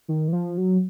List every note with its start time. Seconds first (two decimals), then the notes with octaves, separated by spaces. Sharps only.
0.08 D#3
0.28 E3
0.33 F3
0.57 F#3